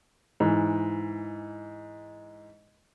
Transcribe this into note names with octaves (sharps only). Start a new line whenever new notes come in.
G#2 E3